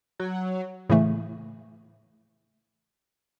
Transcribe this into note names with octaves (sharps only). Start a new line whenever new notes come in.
F#3
A2 C#3 E3 A3